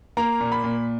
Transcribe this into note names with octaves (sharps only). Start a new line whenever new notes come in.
A#3 A#5
A#2
B5
A#2